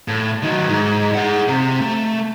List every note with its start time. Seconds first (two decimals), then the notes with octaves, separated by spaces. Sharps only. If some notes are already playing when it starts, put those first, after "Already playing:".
0.08 A2
0.43 D#3 F#3
0.69 G#2
1.15 G#4 F#5
1.48 C3
1.80 A3